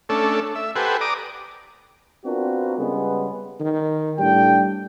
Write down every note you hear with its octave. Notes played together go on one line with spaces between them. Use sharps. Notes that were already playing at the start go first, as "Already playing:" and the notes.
A3 C#4 D4 A4
E5
G4 A4 B4 C5 F#5 G#5
D5 A#5 D6 D#6
B3 C4 D4 F4 F#4 A#4
C#3 G3 G#3 B3
D#3
A2 G3 D4 G5